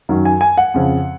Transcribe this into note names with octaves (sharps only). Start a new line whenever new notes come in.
F#2 D#3 F#3
G#5
G#5
F#5
F2 C#3 F3